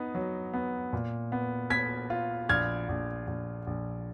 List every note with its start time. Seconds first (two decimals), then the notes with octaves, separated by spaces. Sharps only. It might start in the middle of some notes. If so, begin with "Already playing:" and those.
Already playing: B3 D#4
0.15 F#3
0.53 B3
0.93 A#2
1.32 B3
1.70 B3 G#6 B6
2.10 F4
2.49 A#1 F6 G#6
2.89 A#1
3.27 A#1
3.67 A#1